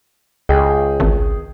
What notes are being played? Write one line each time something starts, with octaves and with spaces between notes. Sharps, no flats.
C#2 G#4 D#5 G5
G#1